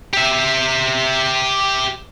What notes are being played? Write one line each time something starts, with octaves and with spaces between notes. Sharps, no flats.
G4 E5